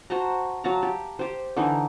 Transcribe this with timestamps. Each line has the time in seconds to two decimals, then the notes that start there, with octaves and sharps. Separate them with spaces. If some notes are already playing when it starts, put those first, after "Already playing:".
0.10 F#4 C5 A5 A#5
0.64 F#3 F5 A5 A#5
0.83 G4
1.19 G4 C5
1.57 D3 E3 D#4